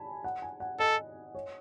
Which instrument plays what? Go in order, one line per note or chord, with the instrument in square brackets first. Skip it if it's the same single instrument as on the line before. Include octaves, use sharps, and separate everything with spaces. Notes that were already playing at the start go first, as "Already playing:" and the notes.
Already playing: [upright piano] G#5 A5 B5
F#5
G#5
F#5
[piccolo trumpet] A4 [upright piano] D#5
[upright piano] C#5